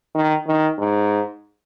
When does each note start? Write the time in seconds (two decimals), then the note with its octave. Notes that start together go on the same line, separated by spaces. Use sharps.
0.15 D#3
0.47 D#3
0.78 G#2